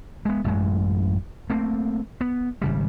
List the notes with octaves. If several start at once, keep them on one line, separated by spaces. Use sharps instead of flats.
G#3 B3
A1 F#2 G#3
A3 A#3 C4
B3
G#1 C#3 G3